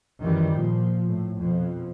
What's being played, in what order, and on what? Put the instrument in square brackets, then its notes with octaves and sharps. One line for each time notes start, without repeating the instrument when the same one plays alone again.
[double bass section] F#2 D#3 E3 G3
A#2 F3
A2
F2 B2